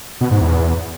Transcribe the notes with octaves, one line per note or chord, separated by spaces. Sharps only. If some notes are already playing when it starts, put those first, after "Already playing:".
B2
G#2
E2